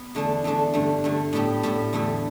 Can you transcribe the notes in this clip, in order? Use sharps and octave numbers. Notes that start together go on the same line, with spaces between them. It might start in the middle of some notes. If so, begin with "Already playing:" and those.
Already playing: B3
E2 D3 A3 D4
E2 D3 A3 D4
G2 D3 A3
G2 D3 A3
A2 G3 B3 E4 G4
A2 G3 B3 E4 G4
E2 D3 A3 E4